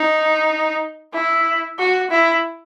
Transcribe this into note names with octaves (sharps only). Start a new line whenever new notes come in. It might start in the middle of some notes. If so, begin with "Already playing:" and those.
Already playing: D#4
E4
F#4
E4